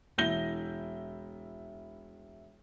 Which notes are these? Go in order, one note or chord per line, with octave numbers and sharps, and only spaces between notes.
E1 E4 G6 A#6 G7